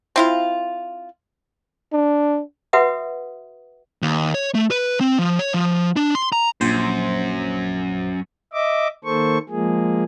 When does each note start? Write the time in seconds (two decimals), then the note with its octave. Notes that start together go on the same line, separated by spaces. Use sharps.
0.16 C4 E4 F4
1.93 D4
2.73 F#4 B4 E5 F#5 D#6
4.02 D#2
4.34 C#5
4.55 A3
4.71 B4
5.00 C4
5.19 F3
5.39 C#5
5.54 F3
5.96 D4
6.15 C6
6.32 A#5
6.61 A#1 F#2 C5
8.53 D#5 E5 D6
9.04 D#3 A#3 A4 C5 C#6
9.49 F3 G#3 A#3 G#4